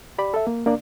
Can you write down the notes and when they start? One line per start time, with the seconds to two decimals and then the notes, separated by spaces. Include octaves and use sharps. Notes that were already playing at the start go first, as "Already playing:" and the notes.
0.18 G4 D5 B5
0.34 A4 E5
0.47 A#3
0.66 A#3 D4 D5